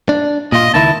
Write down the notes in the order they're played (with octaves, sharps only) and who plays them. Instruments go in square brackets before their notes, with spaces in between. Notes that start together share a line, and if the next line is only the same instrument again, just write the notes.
[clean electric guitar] D4
[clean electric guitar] A#2 F4 [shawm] D#5
[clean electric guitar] C#2 D#3 E4 [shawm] A5